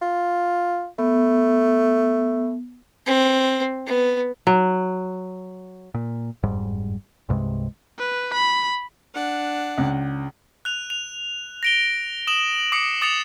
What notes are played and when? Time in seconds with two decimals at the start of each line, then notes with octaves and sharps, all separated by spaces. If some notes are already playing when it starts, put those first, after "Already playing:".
0.02 F4
0.99 A3 B3
3.06 C4
3.86 B3
4.47 F#3
5.94 A#2
6.43 F#1 F2 G#2 G3
7.29 C2 G2 C3 G#3
7.98 B4
8.34 B5
9.15 D4 F#5
9.78 C#2
10.65 F#6 F7
10.90 F7
11.63 A#6 D7 G7
12.27 D#6 E7 F#7
12.72 D6 D#6 C7 C#7
13.01 D6 D#6 A6 C#7 E7 F7